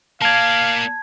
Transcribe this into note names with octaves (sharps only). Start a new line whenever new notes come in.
A#3 D5 F5 A5 G#6